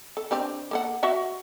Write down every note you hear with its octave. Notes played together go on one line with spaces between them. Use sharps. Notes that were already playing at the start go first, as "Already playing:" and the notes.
A4
C4 D4 G4
A#3 A4 F#5
F#4 E5 F#5